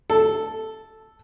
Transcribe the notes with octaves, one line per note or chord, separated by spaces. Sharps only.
A4